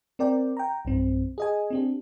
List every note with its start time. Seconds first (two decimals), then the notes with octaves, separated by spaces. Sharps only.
0.19 C4 A#4 D5 G5
0.57 G5 A#5
0.85 B1 G2 C4
1.38 G#4 D#5 G#5
1.70 C4 D4 G4